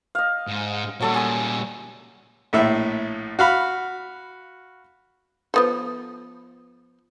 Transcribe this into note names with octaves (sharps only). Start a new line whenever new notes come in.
D#5 F5
G#2
A#2 F#3 G3 A4 E6
G#5 D#6 E6
A#1 A2 E5
F#4 F5 B5
F3 B3 A4